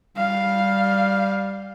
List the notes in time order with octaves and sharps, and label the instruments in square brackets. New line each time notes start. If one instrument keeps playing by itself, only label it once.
[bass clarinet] G3 [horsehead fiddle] F5